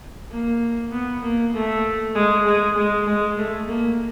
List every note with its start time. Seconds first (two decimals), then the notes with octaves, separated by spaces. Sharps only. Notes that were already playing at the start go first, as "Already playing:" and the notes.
0.30 A#3
0.91 B3
1.22 A#3
1.54 A3
2.15 G#3
2.46 G#3
2.77 G#3
3.07 G#3
3.38 A3
3.68 A#3